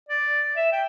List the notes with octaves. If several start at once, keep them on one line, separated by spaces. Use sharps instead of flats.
D5
E5
G5